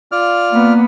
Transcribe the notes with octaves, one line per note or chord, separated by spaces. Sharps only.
F4 D5 F6
A#3 B3